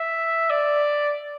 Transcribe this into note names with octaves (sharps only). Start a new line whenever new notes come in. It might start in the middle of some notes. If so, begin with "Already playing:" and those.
Already playing: E5
D5